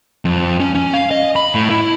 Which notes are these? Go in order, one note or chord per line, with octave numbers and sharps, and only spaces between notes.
F2
C#4
C#4
F5
D#5
B5
A2
E4